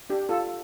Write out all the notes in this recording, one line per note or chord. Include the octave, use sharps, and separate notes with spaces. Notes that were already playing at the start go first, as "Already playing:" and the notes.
D4 G4
F4 A4